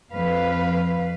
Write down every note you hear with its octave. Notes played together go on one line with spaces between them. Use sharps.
F2 B4 F5